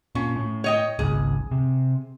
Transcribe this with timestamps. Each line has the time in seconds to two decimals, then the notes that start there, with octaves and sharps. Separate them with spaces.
0.15 A#2 C#4
0.36 A2
0.64 C#5 D#5 G5
0.99 G#1 C#2 G#4
1.51 C3